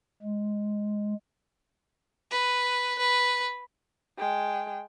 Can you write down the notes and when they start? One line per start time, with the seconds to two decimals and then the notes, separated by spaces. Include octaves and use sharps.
0.22 G#3
2.31 B4
2.98 B4
4.18 G#3 G5